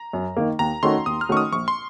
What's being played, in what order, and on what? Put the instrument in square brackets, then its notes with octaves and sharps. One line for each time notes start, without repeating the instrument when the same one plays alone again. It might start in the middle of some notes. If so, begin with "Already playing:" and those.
Already playing: [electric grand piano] A#5
[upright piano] F#2
D#3 A#3
[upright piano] D#2 [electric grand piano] A#5
[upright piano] D#3 A3 C#4 F#4 [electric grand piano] C6
[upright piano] D#2 [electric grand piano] D#6
[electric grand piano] F6
[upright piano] D#3 A3 C#4 F#4 [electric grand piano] C#6
[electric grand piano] D#6
[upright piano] A#1 [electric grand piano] C#6
[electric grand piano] C6